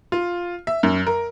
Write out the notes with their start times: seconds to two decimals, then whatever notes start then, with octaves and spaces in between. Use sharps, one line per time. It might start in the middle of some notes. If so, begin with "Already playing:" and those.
0.12 F4
0.67 E5
0.83 F#2
1.07 A#4